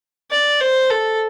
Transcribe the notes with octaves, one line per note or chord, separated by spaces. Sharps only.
D5
C5
A4